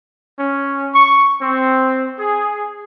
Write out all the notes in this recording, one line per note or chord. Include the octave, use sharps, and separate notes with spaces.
C#4
C#6
C4
G#4